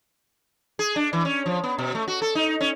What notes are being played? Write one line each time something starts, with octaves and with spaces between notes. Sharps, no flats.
G#4
D4
E3
C#4
F3
B3
B2
A3
F#4
A4
D#4
C#4